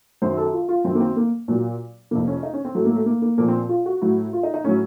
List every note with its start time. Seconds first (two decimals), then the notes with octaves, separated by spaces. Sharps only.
0.22 F#2 D#3 F#3 C5
0.37 A4
0.53 F4
0.69 F4
0.84 F#2 D#3 F#3 C4
0.95 A#3
1.01 C4
1.16 A#3
1.48 A#2 F#3
2.11 F2 C3 F3 A#3
2.27 C#4
2.43 D#4
2.53 C#4
2.65 C4
2.75 A2 F#3 A3
2.85 A#3
2.96 A3
3.06 A#3
3.22 A#3
3.38 A#2 F3 A#3
3.48 C4
3.69 F4
3.86 F#4
4.02 A2 F#3
4.33 F4
4.43 D#4
4.54 D#4
4.64 A2 F#3 C#4